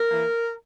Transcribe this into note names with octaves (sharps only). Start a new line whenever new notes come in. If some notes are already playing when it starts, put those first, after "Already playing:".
Already playing: A#4
E3 A#3